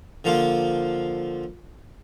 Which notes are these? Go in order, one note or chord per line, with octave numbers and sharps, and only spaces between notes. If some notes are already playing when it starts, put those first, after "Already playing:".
D3 F3 A#3 F4